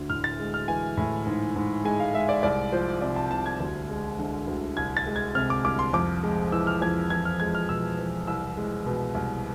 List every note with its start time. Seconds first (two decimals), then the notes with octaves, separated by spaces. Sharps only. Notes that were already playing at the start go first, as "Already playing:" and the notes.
Already playing: D2 D3
0.10 A2 F6
0.24 A6
0.39 G#3
0.54 F6
0.68 E3 G#5
0.97 A2
1.27 G#2
1.56 G#2
1.85 G#3 G#5
2.00 F5
2.14 G#3 E5
2.29 D5
2.43 C2 D5
2.72 F3 C5
3.01 C3 D5
3.16 A5
3.31 C2 A5
3.46 G#6
3.60 D2
3.89 G#3
4.19 D3
4.47 D2
4.77 C2 G#6
4.97 A6
5.06 G#3
5.16 G#6
5.35 C3 F6
5.50 D6
5.65 C2 D6
5.79 C6
5.93 F2 D6
6.23 G#3
6.52 E3 E6
6.67 F6
6.81 F2 G#6
7.10 E2 G#6
7.25 F6
7.40 G#3 G#6
7.55 F6
7.69 B2 E6
7.98 E2
8.27 C2 E6
8.57 G#3
8.86 B2
9.15 C2